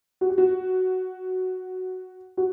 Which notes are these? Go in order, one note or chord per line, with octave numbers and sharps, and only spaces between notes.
F#4
G4
F#4
F#4